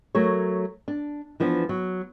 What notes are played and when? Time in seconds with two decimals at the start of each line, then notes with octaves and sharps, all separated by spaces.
0.15 F#3 A3 A#4 C#5
0.88 D4
1.40 E3 F3 B3 D4
1.69 F#3